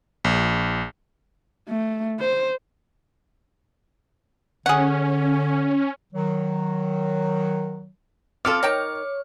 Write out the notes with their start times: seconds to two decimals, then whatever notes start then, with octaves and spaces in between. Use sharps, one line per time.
0.24 A#1
1.68 A3
2.20 C5
4.66 D3 C#4 G#4 F#5
6.13 D#3 F#3
8.45 C4 F4 A4 D6 F6 C#7
8.63 D#3 C#5 G5 A#5